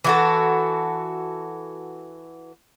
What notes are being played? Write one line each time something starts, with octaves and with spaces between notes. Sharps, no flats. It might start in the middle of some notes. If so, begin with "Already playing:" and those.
E3 F#4 A4